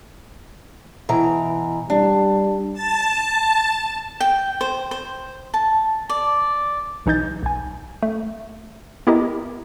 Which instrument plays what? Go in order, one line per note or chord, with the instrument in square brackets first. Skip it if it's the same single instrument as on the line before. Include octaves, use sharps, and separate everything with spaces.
[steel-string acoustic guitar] B2 E3 A#5
[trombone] G3 [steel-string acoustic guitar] D4
[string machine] A5
[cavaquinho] G5
C5
C5
A5
D5
[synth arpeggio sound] B1 E3 D#4 D#5 G6 A6
B1 G#5
A3
B3 E4 G4 A#4 D#5 A#5